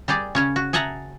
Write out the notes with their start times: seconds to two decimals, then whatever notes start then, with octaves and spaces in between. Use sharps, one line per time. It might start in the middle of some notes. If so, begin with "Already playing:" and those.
0.08 G3 G4 G#4 D5
0.35 C#3 C#4 C#5
0.56 F#4
0.73 G#4 E5 F#5 A5 A#5